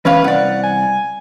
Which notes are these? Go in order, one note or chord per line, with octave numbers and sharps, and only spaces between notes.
E3 C#4 B4 F5
C2 D5 F#5
G#5